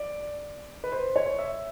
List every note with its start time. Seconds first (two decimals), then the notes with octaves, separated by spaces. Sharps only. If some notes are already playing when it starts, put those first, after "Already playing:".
Already playing: D5
0.84 B4
0.92 C5
1.16 C#5
1.39 E5